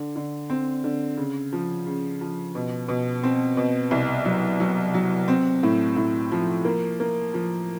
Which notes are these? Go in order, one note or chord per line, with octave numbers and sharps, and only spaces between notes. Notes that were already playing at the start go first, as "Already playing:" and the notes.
Already playing: D3
D3
C4
D3
C#3
F3
C#3
F3
B2
B2
C4
B2
C2
F#3
F#3
F#3
C4
A2
A2
F3
A#3
A#3
F3